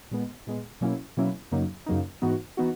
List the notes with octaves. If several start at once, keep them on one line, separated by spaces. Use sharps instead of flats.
A#2 G#3 B3
A#2 G#3 B3
B2 F#3 A#3 C#4 E4
B2 F#3 A#3 C#4 E4
F#2 C#3 F#3 A#3 D#4
F#2 C#3 F#3 A#3 D#4
G#2 E3 B3 D#4 F#4
E3 B3 D#4 F#4